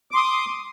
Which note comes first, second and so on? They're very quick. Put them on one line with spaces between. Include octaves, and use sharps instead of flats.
D6 C6 D#6